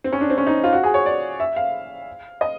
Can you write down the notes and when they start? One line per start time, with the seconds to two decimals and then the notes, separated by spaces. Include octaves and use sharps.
0.04 C4
0.12 C#4
0.21 D4
0.30 C4
0.38 C#4
0.47 D#4
0.64 F4
0.72 F#4
0.83 G#4
0.94 C#5
1.06 D5
1.40 E5
1.56 F5
2.41 D#5